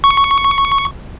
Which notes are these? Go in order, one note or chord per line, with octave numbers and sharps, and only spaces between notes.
C#6